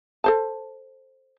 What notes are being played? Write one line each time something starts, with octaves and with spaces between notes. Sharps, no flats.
A4 C5 A5